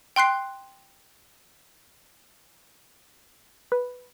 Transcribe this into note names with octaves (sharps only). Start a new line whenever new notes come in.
G5 C6 F#6 C7
B4